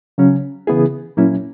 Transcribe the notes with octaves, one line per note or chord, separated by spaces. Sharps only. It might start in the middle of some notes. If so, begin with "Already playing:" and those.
C#3 F#3 C#4
C#3 E3 B3 E4 G#4
A#2 F#3 A#3 C#4 E4